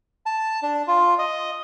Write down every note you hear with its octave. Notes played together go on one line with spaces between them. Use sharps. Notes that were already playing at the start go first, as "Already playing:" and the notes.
A5
D4
F4
D#5